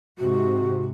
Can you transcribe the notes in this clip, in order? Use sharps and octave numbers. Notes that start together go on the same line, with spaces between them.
G#2 C3 F#4